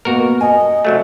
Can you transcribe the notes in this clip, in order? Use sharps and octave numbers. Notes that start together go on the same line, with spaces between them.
B2 A#3 B3 F#4 A#4
D#5 G#5
C2 F#3 A3